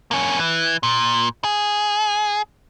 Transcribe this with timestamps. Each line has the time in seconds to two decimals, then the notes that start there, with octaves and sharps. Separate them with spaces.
0.11 A#3 C#4
0.39 E3
0.83 A#2
1.44 G#4